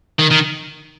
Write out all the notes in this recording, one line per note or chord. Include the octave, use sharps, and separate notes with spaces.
D#3
D#3